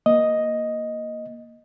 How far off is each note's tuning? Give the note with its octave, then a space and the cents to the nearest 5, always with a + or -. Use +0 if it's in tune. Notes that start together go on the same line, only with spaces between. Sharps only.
A#3 +0 D#5 +0